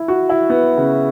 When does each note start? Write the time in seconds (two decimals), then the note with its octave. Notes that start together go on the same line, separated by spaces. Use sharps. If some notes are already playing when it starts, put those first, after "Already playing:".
Already playing: E4
0.08 F#4
0.29 E4
0.50 B3
0.77 C#3